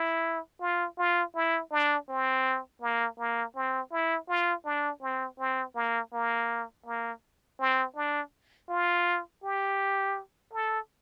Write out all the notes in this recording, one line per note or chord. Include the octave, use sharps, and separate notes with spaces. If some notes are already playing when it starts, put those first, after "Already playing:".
Already playing: E4
F4
F4
E4
D4
C4
A#3
A#3
C4
E4
F4
D4
C4
C4
A#3
A#3
A#3
C4
D4
F4
G4
A4